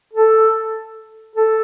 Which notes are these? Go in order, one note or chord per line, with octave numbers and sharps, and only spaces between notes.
A4
A4